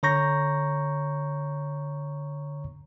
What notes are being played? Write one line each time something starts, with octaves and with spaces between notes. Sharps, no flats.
D3 C#5 A#5 C#6 G6 A#6